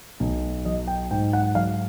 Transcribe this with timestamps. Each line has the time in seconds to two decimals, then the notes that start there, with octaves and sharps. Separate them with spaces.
0.20 B1
0.65 F#3 D#5
0.87 G5
1.11 G#2 G5
1.33 F#5
1.55 F#3 F5